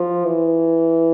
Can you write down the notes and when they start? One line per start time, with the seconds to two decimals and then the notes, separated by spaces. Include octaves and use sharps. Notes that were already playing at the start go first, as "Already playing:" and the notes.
Already playing: F3
0.25 E3